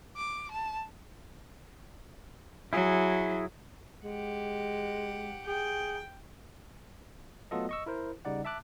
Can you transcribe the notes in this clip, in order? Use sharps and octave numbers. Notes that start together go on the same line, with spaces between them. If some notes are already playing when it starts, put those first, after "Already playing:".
D6
A5
F#3 E4 G#4
G#3 G4 F#5
G#4 G5
F#3 A3 B3 F4 A4 D#5
D#5 C#6 E6
E4 A#4 C5
C#3 G3 D#4 D5 F#5
E5 A5 D6 F#6